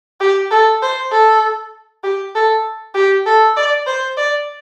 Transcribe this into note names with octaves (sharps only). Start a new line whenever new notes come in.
G4
A4
C5
A4
G4
A4
G4
A4
D5
C5
D5